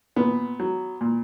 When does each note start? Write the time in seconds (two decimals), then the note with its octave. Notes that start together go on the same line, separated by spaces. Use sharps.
0.16 A#2 B3
0.60 F#3
1.01 A#2